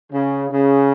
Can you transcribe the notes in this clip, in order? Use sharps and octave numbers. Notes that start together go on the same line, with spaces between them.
C#3
C#3